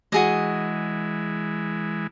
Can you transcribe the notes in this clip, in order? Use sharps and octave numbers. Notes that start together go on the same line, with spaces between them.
E3 G#3 F#4 G#4 D#5